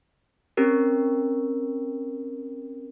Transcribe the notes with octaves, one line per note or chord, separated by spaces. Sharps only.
C4 C#4 G4 A#4